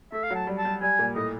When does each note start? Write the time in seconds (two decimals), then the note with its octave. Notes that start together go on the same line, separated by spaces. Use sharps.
0.12 A3 E5
0.24 F5
0.30 F#3 A5
0.47 G3
0.58 A5
0.65 G3
0.81 G3 G#5
0.99 A#2
1.16 A2 D#5